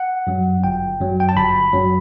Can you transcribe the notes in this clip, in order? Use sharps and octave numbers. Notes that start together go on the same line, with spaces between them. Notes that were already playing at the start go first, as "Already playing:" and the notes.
Already playing: F#5
F#2 F#3
G1 G5
F#2 F#3
G5
A5
G1 B5
F#2 F#3